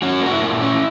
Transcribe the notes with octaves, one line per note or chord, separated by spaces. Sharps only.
C#4 F#4
A#3 F#4
E4
A#2
C#4